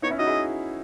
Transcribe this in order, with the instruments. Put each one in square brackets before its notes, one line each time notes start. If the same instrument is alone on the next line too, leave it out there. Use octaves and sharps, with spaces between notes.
[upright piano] B3 D#4 [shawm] C#5
[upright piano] C#4 E4
[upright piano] D#4 F#4 [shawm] D#5
[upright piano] E4 G#4